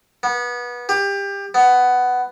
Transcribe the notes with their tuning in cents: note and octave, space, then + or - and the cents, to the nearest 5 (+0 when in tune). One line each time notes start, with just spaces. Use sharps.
B3 -25
G4 +25
B3 +10